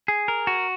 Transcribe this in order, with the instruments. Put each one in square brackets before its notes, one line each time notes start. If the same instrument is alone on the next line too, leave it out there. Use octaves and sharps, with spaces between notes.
[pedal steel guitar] G#4
A#4
F#4